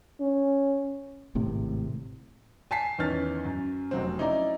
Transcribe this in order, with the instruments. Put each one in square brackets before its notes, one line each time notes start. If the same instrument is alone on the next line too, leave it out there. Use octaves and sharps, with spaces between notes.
[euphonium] C#4
[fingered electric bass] G#1 A2 C3
[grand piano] G#5 A5 B6 C7
E2 D#3 E3 C#4 F6 A6
F#2
F1 F#3 C4
C#4 D#4 E4 D5 A#5